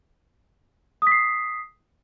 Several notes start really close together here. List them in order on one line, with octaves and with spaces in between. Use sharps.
D#6 B6 C7